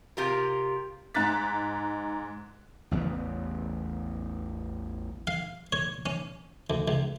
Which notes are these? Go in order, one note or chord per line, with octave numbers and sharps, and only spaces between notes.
C3 F4 G4 A#4
G#2 D#4 A#5 F#6 A6 B6
A1 E2 C#3 B3
F5
C#5
C#4
D2
C#2